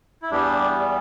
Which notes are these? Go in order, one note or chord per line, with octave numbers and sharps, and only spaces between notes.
E4
E2 E3 G3 B3 D4 G4